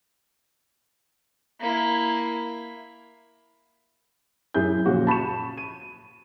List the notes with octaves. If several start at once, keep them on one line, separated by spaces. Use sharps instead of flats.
A#3 E4
F#2 E4 G#4 G6
A#2 C#3 F3 F#4
A5 B5 C#6 E7
D#7